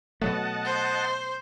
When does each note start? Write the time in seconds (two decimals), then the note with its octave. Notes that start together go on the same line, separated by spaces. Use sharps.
0.22 B2 F#3 A3 D#5 F#5 A5
0.65 C5